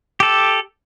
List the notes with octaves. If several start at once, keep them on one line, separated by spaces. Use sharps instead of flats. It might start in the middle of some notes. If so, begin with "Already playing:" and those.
G4 A4